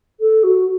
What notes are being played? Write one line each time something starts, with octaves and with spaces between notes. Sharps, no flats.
A4
F#4